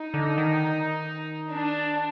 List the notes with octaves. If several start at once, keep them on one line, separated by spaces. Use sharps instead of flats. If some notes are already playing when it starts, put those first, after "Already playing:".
Already playing: D#4
D3
D#3
D4